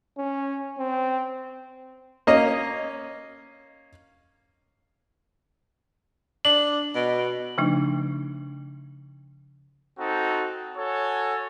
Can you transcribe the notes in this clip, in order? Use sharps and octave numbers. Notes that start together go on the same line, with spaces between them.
C#4
C4
A#3 C#4 D#5
D4 F#7
B2
C#3 F3 A3 D4 D#4
C4 D#4 F#4 A4
F#4 A4 C#5 G#5